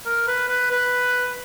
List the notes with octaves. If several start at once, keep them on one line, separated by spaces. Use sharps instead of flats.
A#4
B4
B4
B4